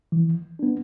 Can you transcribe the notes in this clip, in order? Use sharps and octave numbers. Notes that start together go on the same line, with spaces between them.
E3
B3 D4